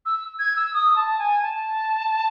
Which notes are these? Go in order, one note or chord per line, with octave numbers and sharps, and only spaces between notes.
E6
G#6
E6
D#6
A5
G#5
A5